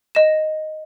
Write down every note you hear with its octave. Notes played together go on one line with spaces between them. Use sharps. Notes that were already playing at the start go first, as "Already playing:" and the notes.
D#5 A#6 E7